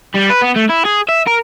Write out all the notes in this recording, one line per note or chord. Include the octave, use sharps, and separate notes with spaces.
G3
B4
B3
A3
E4
G#4
E5
A#4